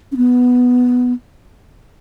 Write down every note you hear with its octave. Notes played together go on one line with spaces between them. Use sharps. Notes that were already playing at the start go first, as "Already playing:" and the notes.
C#4
B3